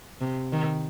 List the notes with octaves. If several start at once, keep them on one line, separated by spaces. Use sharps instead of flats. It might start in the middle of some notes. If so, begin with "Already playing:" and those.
C3
D#3